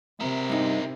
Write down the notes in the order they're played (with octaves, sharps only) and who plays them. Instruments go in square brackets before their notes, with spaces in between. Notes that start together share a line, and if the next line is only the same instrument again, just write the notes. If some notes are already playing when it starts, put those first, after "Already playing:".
[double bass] C3 [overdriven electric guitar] E4 A#4
[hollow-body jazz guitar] G2 D#4